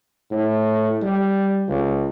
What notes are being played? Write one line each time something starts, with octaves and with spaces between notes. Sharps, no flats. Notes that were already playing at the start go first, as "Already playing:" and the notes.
A2
G3
C#2